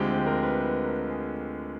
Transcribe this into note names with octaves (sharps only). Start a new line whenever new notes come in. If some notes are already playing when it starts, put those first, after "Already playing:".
Already playing: D2 D3 F3 G#3 C4 G4
A#4
B4
B4
A#4
G#4